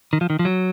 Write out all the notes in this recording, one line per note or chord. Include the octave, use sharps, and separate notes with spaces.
D#3
F3
D#3
F3
F#3